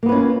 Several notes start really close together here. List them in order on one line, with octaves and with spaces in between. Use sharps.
A#3 B3 B4 C#4 F4